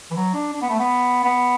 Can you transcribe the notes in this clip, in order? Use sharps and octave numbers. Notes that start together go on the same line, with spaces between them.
E3
F#3
D4
D4
B3
A3
B3
B3